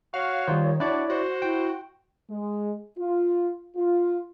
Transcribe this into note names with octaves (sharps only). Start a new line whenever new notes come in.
F#4 C#5 F5
D#3 G3 F4 C5
D4 E4 F#4 D5
F#4 C5
E4 G5
G#3
F4
F4